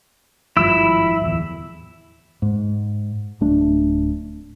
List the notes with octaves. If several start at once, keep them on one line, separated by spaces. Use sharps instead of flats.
G#1 G2 F3 E4 E6
D1 E2
G#2
D1 A3 D4